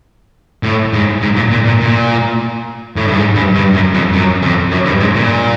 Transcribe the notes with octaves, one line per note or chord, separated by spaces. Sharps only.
A2
G#2
G#2
A#2
A#2
A#2
A#2
A2
G2
G#2
G2
G2
F#2
F2
F#2
F2
F#2
G2
G#2
A#2